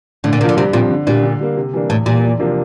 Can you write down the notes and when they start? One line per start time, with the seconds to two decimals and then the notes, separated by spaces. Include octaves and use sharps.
0.24 A2 D3
0.33 A#2
0.40 C3 A#3
0.44 D3 F3
0.57 G2 C3
0.73 A#2 F3 C4
0.91 D3
1.07 A#2 G3 D4
1.23 D3
1.40 G3 A#3
1.57 C3
1.73 E3 G3 A#3 D4
1.89 E2 A2
2.06 A#2 E3 G3
2.23 E2
2.39 C3 F3 A#3 D4